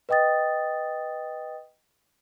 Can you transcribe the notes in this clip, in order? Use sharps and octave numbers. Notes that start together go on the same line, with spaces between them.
B4 D#5 G5 D#6 A6